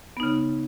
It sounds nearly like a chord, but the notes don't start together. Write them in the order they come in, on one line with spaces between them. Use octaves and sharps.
B3 D#4 C#3